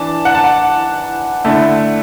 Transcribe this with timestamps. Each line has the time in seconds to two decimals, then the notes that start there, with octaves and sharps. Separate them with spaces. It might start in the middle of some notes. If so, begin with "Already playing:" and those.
Already playing: E3 D4 A5
0.25 F#5
0.35 A5
0.44 F#5
1.44 D3 A3 E4